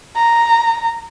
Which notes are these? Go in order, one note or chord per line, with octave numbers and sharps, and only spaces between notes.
A#5